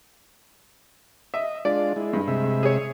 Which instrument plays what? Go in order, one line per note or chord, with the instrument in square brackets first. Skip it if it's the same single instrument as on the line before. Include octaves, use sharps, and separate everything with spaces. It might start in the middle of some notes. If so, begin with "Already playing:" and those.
[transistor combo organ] D#5 [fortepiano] E5
[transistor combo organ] G#3 D4 F4 [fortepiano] D5
[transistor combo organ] G#3 E4
[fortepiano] G2
[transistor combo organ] C3 G#3 E5
[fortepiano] G#4 C#5